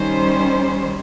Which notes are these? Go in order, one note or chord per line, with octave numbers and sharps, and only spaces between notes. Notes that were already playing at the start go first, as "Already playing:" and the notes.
Already playing: D#3 G3 C#4 C5